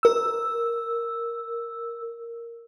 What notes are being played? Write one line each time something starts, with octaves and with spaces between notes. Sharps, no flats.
A#4 E6